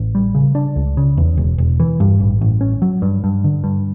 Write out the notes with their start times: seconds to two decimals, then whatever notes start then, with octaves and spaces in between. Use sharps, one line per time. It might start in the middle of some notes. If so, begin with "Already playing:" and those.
Already playing: A1
0.15 G3
0.35 C#3
0.55 D4
0.76 C#2
0.97 C#3
1.17 E2
1.37 E1
1.58 E1
1.80 E3
2.00 G2
2.20 A1
2.41 A1
2.61 C#4
2.82 F#3
3.02 G2
3.24 G2
3.44 D3
3.64 G2